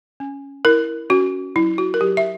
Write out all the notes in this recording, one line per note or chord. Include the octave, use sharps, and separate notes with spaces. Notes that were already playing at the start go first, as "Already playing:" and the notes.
C#4
E4 A#4
C#4 F#4
F#3 E4
F#4
A#4
F#3 G4
E5